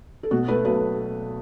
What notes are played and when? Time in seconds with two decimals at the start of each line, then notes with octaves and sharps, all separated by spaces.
0.23 A4
0.31 B2 F#4
0.48 A3 B4
0.65 B1 B4